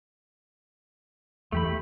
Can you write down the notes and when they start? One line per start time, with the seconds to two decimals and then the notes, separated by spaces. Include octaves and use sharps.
1.52 E2 E3 A3 G4 B5